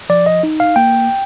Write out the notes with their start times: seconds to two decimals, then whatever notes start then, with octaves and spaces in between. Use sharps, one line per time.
0.09 F3 D5
0.26 D#5
0.43 D#4
0.60 F5
0.76 A#3 G5